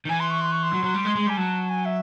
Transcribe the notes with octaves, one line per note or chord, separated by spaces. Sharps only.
D#3
E3 G#5
C6
C#6
C6
C#6
C6
F#3
F#3
G3
G#3
G#3
G3 G#5
F#3 A5
G#5
E5